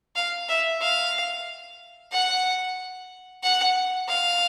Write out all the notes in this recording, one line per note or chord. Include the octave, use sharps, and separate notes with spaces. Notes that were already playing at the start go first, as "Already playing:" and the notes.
F5
E5
F5
F#5
F#5
F5